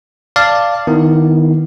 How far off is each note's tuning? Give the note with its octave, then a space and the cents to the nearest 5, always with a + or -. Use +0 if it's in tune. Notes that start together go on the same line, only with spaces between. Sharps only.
D5 +0 F5 -10 A5 +10
D#3 +0 B3 +0 E4 -15